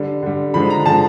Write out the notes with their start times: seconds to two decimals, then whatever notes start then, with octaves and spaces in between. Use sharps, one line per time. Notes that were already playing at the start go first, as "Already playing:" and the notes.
Already playing: D3 G3
0.22 D3 G3
0.54 D3 F3 G#3 B5
0.70 A#5
0.85 D3 F3 G#3 A5